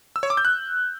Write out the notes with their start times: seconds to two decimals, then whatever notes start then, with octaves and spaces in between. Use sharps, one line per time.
0.16 E6
0.23 C#5
0.30 D6
0.37 G6
0.45 F#6